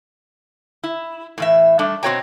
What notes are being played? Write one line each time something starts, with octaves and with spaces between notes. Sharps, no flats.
E4
A2 E3 E5
G3 A3 D4
B2 C4 F#4 C#5 G5 A#5